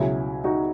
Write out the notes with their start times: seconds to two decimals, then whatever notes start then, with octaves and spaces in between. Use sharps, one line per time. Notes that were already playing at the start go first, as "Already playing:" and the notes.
Already playing: C#2 B2 F#3 E4 G#4
0.44 D#4 F#4